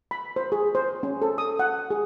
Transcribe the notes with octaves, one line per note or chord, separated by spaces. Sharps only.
B5
C5
G#4
C5
C#4
A4
D#6
F#5
G#4